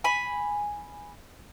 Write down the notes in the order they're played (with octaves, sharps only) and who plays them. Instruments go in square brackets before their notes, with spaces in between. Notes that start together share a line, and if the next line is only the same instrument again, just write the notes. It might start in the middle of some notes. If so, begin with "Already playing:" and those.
[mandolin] G#5 B5